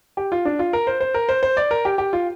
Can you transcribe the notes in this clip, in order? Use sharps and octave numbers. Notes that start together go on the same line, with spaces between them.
G4
F4
D4
F4
A#4
C5
C5
A#4
C5
C5
D5
A#4
G4
G4
F4